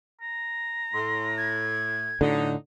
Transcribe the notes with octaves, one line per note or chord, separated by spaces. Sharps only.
A#5
A2 C6
G#6
A2 D3 F#3 D#4